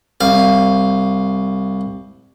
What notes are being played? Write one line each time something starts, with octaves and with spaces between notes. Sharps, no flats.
C2 F5